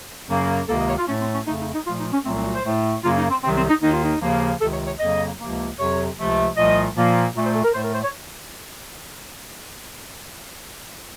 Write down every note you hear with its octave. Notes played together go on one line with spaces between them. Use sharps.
F#2 C#3 F#3 A#3
C#2 C3 D#3 A#3 A4
D#5
C#5
F4
A2 A3 C#4
C4
C#4
F2 C#3 A3 D#4
D#4
D#4
A#2 F3 A3 F4
D#4
C#4
C2 A#2 F#3 A3 C4
C4
F#4
C5
A2 A3
F#2 C#3 F#3 A#3 F4
D#4
C4
C2 C3 D#3 F#3 C4
C4
D#4
D#2 D#3 A#3 D#4
F4
D#4
D#2 C#3 F3 A#3
C#2 C3 D#3 A4
C#5
C#5
F2 C#3 F#3 A#3 D#5
C#2 C3 F3 A#3
F2 C3 F#3 C#5
C#2 C3 F3 A3
C2 A#2 F3 A3 D#5
A#2 F3 A#3
A#2 A3
C5
A4
A#4
A2 A3 C5
A#4
C5
C#5